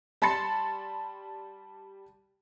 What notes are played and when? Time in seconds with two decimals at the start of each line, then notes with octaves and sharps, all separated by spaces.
0.22 G3 A5 B5 C6 A6 C#7